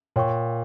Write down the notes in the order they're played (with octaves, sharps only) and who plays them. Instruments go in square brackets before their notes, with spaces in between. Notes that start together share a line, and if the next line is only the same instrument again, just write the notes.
[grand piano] A#2 [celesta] C#5 G5 C#6